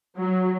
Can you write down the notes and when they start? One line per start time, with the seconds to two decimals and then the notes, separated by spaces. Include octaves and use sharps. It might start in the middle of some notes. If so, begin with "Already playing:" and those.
0.17 F#3